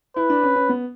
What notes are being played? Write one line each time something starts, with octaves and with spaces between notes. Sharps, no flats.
E4 B4
D4
C#4
C#4
B3